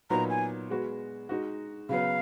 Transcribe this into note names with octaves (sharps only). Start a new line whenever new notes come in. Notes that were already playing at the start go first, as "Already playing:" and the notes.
A#2 F#3 B3 D#4 A#5
G#5
G#3 B3 F#4
G#3 D#4 F#4
C#3 F#3 B3 F5